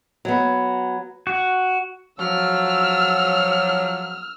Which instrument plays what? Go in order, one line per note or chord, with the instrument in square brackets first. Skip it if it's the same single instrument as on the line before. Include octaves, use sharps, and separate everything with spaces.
[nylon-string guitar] F#3 B3
[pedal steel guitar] F#4
[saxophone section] F3 F#3 [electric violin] E6 F6